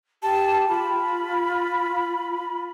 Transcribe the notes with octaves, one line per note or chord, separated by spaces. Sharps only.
G4 A5
F4 B5